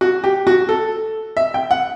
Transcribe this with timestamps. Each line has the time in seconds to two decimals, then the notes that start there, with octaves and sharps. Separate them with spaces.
0.01 F#4
0.24 G4
0.47 F#4
0.69 A4
1.37 E5
1.54 G5
1.71 F#5